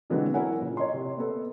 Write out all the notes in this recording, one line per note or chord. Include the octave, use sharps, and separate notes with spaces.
B2 D3 E3 F#3 G#3 C4
E4 F#4 A#4 C#5 F#5 G#5
A#2 C#3
C#5 D#5 A#5 C6
C3
A#3 B3 A4